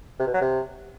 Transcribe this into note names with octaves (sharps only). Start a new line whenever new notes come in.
C3
B2
F#3
C3